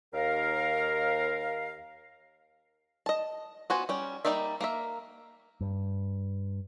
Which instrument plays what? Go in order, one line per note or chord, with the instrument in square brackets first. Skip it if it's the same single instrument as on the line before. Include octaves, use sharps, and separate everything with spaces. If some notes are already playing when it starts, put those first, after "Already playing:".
[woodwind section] D#2 A#4 F5
[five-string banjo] D#5 A5
B3 F4 F#4 C5 G#5
G3 C#4 G5
G3 A#3 D#4 D5 E5
A#3 A#4 E5
[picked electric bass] G2